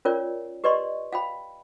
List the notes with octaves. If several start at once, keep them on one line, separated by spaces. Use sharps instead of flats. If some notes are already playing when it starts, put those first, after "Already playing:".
C#4 F4 A#4 C#5 D5
G4 B4 D5 D#5 C6 C#6
F5 G5 B5